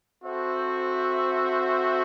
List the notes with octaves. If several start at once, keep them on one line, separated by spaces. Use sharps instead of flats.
C4 F#4 A4 C5 E5